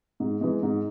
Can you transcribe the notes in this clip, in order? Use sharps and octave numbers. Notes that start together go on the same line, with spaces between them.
G#2
E3 G#3
G#2